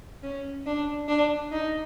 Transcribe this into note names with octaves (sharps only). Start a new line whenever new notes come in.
C#4
D4
D4
D#4